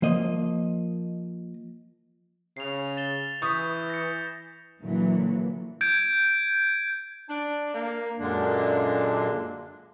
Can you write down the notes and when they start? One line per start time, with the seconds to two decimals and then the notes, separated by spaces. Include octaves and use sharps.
0.02 F3 A#3 D#5
2.57 C#3 C7 F7
2.97 A6 E7 G7
3.42 E3 C#6 D#6 G6 B6
3.90 A#6 C#7
4.84 A#2 D3 E3 F#3 A#3
5.81 G6 G#6 D7
7.29 D4
7.74 A#3
8.18 F#2 A#2 D3 G#3 A#3 D4